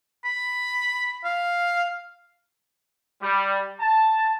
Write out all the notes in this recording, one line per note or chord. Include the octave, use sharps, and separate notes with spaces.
B5
F5
G3
A5